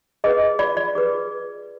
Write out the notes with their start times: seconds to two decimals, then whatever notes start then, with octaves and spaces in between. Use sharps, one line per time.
0.24 G#4 B4 D#5
0.59 F4 D5
0.77 D5
0.95 G#4 B4